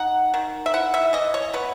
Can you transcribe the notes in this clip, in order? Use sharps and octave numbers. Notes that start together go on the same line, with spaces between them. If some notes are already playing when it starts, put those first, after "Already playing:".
Already playing: D#4 F#5
D#3
E5
E4 F#5
E5
E3 D#5
C#5
B3 B4